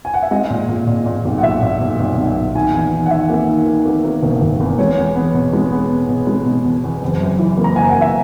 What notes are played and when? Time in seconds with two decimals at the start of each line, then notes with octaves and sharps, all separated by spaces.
0.05 G#5
0.14 F#5
0.23 E5
0.31 G#3 D#5
0.50 A#2
0.69 A#2
0.87 A#2
1.06 A#2
1.25 B1
1.38 F#5
1.43 A#2 E5
1.62 A#2
1.81 B1
2.00 B1
2.17 B1
2.37 A#2
2.55 D#3 G#5
2.74 E2
2.92 D#3
3.06 F#5
3.11 D#3 E5
3.29 A#3
3.49 D#3
3.67 D#3
3.85 A#3
4.04 A#3
4.22 E1
4.42 E1
4.60 E2
4.78 G#3 C#5
4.97 E2
5.16 B3
5.34 B2
5.53 G#3
5.72 B3
5.90 B2
6.09 B2
6.27 G#3
6.46 B2
6.65 E2
6.84 E2
7.02 F#1
7.21 F#2
7.39 E3
7.58 A#3
7.64 A#5
7.76 F#1 G#5
7.89 F#5
7.95 F#1
8.01 E5